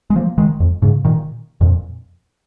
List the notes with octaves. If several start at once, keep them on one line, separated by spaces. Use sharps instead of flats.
G#3
F3 A#3
D#3 G#3
F2
G#2 C#3
A#2 D#3
F2 A#2